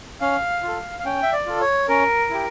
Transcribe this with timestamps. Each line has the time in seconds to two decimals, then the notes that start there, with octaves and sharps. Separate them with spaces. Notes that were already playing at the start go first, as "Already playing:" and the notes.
0.21 C#4 F5
0.63 F4 A4
0.99 F5
1.05 C#4 G5
1.22 E5
1.32 D5
1.46 F4 A4
1.61 C#5
1.88 C#4 A#4
2.30 E4 G4